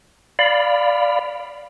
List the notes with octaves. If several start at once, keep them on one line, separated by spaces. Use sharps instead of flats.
D5 F5 B5